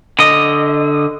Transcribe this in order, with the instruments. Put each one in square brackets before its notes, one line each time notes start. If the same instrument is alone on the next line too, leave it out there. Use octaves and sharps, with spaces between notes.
[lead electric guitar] D3 D#5